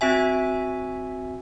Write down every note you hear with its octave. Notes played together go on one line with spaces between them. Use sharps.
C4 F#4 E5 G#5